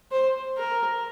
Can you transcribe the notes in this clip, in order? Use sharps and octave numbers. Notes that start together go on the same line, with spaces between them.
C5
A#4